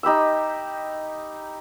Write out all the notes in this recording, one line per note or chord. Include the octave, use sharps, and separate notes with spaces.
D#4 G4 B5 E6